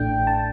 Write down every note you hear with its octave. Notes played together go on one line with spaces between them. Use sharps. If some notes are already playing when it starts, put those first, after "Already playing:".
Already playing: A1 A2 A3 D4 G5
A5